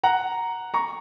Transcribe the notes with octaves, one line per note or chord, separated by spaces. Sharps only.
F#5 A#5
A#5 C#6